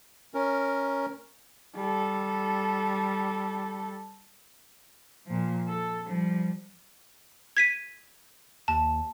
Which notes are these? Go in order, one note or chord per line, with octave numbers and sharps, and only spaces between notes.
C#4 A#4
G3 A4
A#2 F3
A4
F3 G3
G#6 B6 D#7
D#2 A5